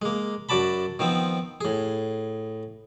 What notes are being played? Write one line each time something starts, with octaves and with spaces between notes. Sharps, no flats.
G#3 A#3
F#2 F#4 D5 A5 B5
D#3 F3 B3 C4
A2 G#4